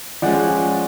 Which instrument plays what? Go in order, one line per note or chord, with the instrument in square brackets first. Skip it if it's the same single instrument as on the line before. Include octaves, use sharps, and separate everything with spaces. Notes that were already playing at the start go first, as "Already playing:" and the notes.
[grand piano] F3 G#3 C#4 D5 F#5